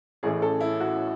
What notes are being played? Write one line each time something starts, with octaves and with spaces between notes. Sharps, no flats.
A1 A2 E3 A3 C#4 G#4
A4
E4
F#4